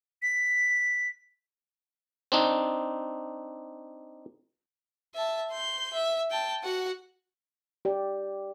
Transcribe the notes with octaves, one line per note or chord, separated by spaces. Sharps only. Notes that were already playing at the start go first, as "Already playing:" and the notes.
B6
C4 D4 D#4
E5 A5
C6 G6
E5
G5 A5
F#4 F#5
G4 D5